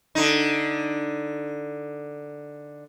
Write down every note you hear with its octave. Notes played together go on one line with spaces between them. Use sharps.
D3 D#4